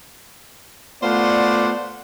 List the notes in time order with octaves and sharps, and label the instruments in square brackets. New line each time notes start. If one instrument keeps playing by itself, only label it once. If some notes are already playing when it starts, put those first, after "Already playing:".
[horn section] A3 B3 F4 C5 D5 F#5